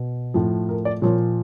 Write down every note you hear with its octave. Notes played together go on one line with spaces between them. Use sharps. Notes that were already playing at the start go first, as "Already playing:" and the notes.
Already playing: B2
A2 F3
A#4
D5
A#2 F3 C#5